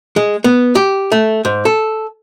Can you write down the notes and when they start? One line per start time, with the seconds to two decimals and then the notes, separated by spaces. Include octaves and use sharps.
0.16 G#3
0.44 B3
0.75 G4
1.12 A3
1.45 G#2
1.65 A4